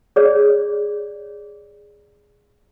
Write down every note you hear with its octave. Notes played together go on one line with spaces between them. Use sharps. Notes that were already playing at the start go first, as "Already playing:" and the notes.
G#4 C#5 D5